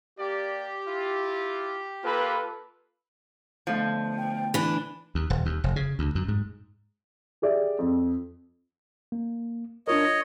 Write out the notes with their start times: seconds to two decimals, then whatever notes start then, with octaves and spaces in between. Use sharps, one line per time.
0.19 A#3 G4 D5
0.88 E4 F4
2.04 A#3 F4 A4 B4
3.67 B2 D3 F3 A3
4.18 G5
4.54 E3 D4 B5
5.15 D#2
5.30 D#1
5.46 D#2
5.64 F1
5.76 C#3
5.99 D2
6.15 F#2
6.28 G#2
7.42 G4 G#4 D5 E5
7.79 F2
9.12 A#3
9.88 D4 F4 A#4 C#5 D#5
10.05 A#6